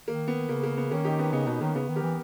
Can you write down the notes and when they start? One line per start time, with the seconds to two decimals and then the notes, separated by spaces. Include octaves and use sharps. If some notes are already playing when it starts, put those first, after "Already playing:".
0.07 D#3 A#3
0.28 B3
0.49 C#3 A#3
0.63 A#3
0.77 B3
0.91 D#3 A#3 C#4
1.04 D#4 G4
1.19 B3 D#4
1.33 C#3 B3 D#4
1.46 B2 B3 D#4
1.61 D#3 A#3 C#4
1.75 C#3 B3
1.89 D#3
1.96 G4 A#4
2.03 E3